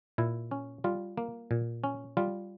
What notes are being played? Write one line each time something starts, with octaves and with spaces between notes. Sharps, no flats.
A#2 E4
C#4
G3 F4
A#3
A#2
C#4
G3 F4